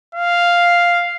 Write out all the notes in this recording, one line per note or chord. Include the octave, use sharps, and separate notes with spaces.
F5